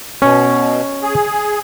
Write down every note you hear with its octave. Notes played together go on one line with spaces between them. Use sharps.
B2 C#4
G#4